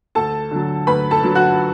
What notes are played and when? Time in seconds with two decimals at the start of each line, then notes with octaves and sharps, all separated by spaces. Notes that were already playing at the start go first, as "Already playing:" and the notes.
0.15 D2 A4 A5
0.51 D3 F#3
0.87 D2 B4 B5
1.11 A4 A5
1.23 D3 F#3
1.35 F#4 F#5